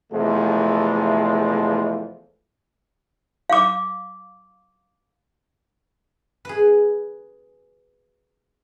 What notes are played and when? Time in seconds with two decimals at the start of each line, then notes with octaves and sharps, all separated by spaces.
0.12 E2 C3 F3 G#3 A3
3.50 F5 D6
6.45 G#4 B4